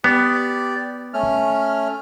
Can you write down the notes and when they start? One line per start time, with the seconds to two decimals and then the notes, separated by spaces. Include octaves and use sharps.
0.04 B3 G4 D5
1.14 A3 C#4 F6